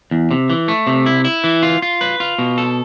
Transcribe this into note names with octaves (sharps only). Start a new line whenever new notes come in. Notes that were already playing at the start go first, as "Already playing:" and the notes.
E2
C3
E3
A3
C3
E4
E4
E3
F4
F4
B4
F4
B2
A4